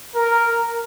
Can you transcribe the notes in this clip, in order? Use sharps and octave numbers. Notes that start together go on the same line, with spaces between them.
A#4